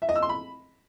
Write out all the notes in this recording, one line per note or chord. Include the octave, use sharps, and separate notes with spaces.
E5
D#5
E6
C6
B5